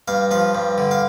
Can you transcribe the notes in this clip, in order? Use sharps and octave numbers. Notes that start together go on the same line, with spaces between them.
G2 F5
F3 F5
G2
D3
F5